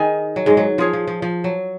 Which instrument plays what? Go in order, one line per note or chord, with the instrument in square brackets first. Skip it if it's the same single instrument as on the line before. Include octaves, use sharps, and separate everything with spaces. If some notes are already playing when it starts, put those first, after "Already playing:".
Already playing: [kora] D#3 [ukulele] G#4 D#5 G#5
[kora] F#3
G#2 G#3
F#3
[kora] F3 [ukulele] F4 G#4 C#5
[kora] F3
F3
F3
F#3